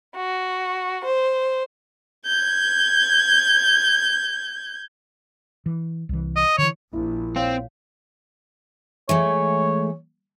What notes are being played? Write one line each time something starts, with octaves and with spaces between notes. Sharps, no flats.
F#4
C5
G6 G#6
E3
C2 E3
D#5
D3 E3 C#5
A#1 E4
C4 C#5 F5
E3 G#3 A3 C#5